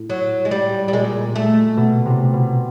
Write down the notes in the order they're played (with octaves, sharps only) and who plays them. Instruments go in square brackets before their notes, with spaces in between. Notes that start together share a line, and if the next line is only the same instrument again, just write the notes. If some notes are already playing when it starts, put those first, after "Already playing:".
Already playing: [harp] A2
[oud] F#3
G#3
G3
G3
[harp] A#2 [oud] G#3
[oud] A3
[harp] B2
C3
B2